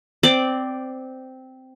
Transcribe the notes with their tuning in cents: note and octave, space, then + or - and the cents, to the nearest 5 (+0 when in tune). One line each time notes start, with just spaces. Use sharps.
C4 -10 D5 +0 D6 +20